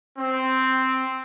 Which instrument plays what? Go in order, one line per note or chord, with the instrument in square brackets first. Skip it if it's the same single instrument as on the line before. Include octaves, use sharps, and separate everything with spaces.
[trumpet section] C4